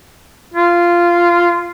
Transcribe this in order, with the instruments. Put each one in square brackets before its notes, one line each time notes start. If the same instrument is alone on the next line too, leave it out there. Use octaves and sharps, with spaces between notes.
[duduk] F4